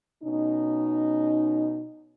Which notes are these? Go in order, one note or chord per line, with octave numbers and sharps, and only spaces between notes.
B2 C#4 D#4